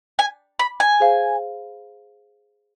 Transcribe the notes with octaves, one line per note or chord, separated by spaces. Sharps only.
G#5
B5
G#5
G#4 C5 F5